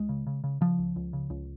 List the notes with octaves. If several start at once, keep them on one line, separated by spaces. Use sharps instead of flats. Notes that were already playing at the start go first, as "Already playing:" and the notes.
Already playing: C#2 G#3
C#3
C#3
C#3
C#3 F3
C#2
C#2
C#3
C#2